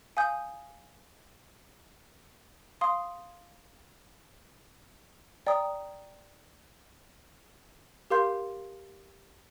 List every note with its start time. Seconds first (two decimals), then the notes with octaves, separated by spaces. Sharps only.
0.17 F5 G#5 D#6 G6
2.81 F5 C6 D#6
5.47 D5 G5 A#5 D#6
8.10 G4 A#4 F5 C6 G6